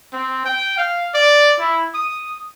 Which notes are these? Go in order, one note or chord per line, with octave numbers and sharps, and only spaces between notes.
C4
G5
F5
D5
E4
D#6